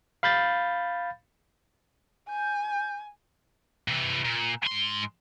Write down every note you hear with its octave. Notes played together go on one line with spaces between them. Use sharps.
F5 B5 G6 A6
G#5 G6
C3 E3
A#2
G#2 C6